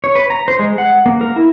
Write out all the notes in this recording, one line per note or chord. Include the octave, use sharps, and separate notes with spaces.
C#5
B4
A#5
C5
G#3
F#5
A#3
A#4
E4